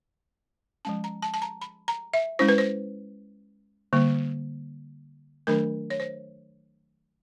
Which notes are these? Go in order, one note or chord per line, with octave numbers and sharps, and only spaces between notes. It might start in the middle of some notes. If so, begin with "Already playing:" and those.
F3 G#3 C#4 A5
A#5
A5
A5
A#5
B5
A#5
E5
G#3 C#4 E4 C5
B4
C5
D3 G3 A#3
D#3 F#3 A3 D4 A#4
C#5
C5